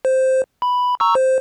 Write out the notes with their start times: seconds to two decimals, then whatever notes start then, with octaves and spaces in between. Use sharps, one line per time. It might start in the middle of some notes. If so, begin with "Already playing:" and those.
0.05 C5
0.62 B5
1.00 A#5 C#6 E6
1.15 C5